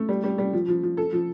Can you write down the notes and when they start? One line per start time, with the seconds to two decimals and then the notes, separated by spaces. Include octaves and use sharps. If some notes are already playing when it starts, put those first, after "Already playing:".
Already playing: A3
0.09 G3
0.24 G3
0.38 G3
0.53 F3
0.68 F3
0.83 F3
0.97 A4
1.13 F3